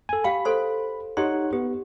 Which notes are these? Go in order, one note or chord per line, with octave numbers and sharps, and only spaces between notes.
A4 G#5
G4 F5 G5 B5
A4 C5 C6
D#4 G4 C#5 F#5 C6
B3 G4